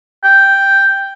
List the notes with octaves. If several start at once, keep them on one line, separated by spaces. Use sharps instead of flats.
G5